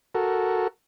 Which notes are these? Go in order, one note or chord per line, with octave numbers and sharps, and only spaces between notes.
F#4 A4 A#4